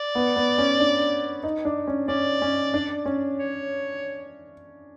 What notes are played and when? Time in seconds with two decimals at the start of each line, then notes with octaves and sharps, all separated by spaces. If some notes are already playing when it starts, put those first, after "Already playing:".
Already playing: D5
0.15 B3
0.36 B3
0.58 C#4
0.80 D4
1.43 D#4
1.65 D4
1.87 C#4
2.08 C#4 D5
2.42 C#4
2.74 D4
3.06 C#4
3.38 C#5